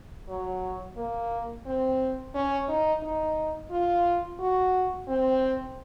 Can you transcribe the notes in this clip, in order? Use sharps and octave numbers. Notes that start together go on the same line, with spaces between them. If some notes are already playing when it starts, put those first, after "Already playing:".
F#3
A#3
C4
C#4
D#4
D#4
F4
F#4
C4